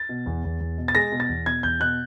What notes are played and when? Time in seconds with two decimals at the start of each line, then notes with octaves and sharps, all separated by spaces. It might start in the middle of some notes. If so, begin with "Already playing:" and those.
Already playing: A6
0.09 B2
0.26 E2
0.44 E2
0.60 E2
0.78 B2
0.88 A6
0.95 G#3 A#6
1.12 B2
1.20 A6
1.29 E2
1.46 B2 G#6
1.63 E2 G6
1.80 B2 F#6